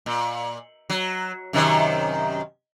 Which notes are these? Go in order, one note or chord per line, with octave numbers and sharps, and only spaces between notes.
A#2
F#3
F#2 C3 D#3